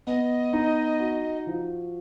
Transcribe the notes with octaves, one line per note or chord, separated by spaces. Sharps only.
B3 D#5
D#4
F#4
F3